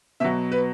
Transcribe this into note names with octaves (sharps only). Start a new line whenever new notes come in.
B2 F#3 E5
B4